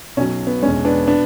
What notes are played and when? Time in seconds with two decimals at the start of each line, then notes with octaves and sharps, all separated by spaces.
0.17 B1 B2 F#3 C#4
0.47 B3
0.62 E1 E2 D3 G#3 C#4
0.85 B3 D4
1.07 B2 B3 D4